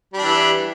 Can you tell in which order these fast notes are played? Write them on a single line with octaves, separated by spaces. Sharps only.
G3 D4 E3